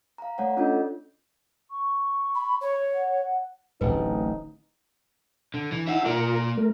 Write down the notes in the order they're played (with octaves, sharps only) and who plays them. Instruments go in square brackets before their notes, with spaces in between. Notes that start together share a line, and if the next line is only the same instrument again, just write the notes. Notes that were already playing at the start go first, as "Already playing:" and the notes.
[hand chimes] F5 A#5
A3 C#5 D5 F#5
C#4 D4 F4 A4 D#5 G6
[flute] C#6
[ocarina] B5
C#5
[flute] F#5
F#5
[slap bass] D1 A1 D2 [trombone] D#4 [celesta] B4
[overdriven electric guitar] D3
E3
[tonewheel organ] D#4 E4 E6 [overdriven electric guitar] E5 F#5
[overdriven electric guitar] A#3 D5 [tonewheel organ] F4 A#4 A#5
[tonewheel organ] A3 A#4